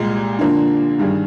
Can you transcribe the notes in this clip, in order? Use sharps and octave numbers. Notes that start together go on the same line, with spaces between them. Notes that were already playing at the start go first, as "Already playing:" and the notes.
Already playing: C2 A#2 G#3
D3 F3 A#3 D4
G2 D#3 G3 D4 G#4